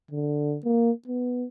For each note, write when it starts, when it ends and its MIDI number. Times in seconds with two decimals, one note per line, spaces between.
0.11 0.57 50
0.64 0.91 58
1.07 1.46 59